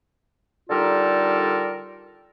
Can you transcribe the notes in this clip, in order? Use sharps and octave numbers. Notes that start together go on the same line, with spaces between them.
D3 G3 D#4 F4 A4 A#4